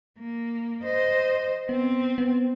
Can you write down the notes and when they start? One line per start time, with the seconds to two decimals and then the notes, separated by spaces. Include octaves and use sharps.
0.20 A#3
0.84 C5 D#5
1.69 B3 C4
2.18 B3